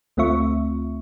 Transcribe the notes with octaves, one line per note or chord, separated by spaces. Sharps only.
D2 A3 C4 F4 E5 C#6